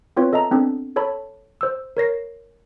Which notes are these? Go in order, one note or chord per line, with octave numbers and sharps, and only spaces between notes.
B3 C4 F4 B4 C#5
A4 D#5 E5 A5 A#5
B3 C4 D4 A4
A4 C#5 A5 B5
C5 E6
A#4 C#5 A#6 C7